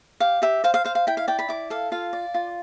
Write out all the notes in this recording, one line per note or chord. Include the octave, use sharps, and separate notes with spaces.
G4 F5
G4 E5
C5 F5
F5
C5 F5
F5
E4 G5
F5
D5 G5
B5
E4 D6
A4 F5
F4 F5
D5
F4